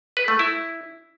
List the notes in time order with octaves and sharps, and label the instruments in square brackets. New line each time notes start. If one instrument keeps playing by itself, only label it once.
[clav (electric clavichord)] B4
A3
E4